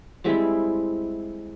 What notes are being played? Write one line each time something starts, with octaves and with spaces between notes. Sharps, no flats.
G3 G#3 C4 E4